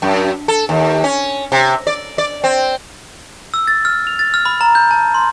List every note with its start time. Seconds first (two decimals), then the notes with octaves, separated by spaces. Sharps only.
0.02 F#2
0.48 A4
0.69 D#2
1.04 C#4
1.52 C3
1.87 D5
2.18 D5
2.44 C4
3.54 E6
3.67 A6
3.85 F6
4.07 F7
4.19 A6
4.34 F6
4.45 B5
4.61 A#5
4.75 G6
4.91 A5
5.14 C6